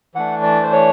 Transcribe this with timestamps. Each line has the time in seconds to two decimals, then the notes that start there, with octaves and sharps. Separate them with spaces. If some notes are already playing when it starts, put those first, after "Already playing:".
0.14 E3 A3 D4 F#5
0.43 D5
0.63 C5
0.72 C#5